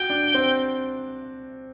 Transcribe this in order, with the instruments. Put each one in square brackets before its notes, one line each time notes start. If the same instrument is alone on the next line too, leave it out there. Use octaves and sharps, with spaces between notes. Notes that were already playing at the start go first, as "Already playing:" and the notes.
Already playing: [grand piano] F#4 [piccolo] G5
[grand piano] D4
C4